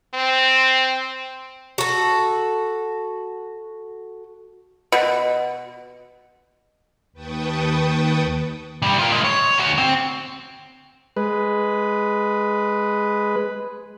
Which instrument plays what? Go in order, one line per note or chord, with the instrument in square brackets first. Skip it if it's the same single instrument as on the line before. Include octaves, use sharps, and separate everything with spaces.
[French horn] C4
[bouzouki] F#4 A4
[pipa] B2
[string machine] D#2 B4 G5 A5 C#6 D#6
[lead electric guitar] C3 G3
F4 A#4
A2 G#3
C#5
D2 F#4
C4
[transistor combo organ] G#3 B4